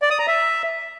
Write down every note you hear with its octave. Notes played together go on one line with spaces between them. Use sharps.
D5
D#6
A#5
E5